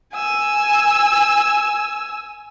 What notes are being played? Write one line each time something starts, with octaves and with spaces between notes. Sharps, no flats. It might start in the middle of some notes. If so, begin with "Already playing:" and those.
G#5 E6